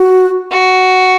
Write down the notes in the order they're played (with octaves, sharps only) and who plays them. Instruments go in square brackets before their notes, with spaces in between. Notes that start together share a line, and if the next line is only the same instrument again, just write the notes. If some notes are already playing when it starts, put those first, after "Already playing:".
Already playing: [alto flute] F#4
[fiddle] F#4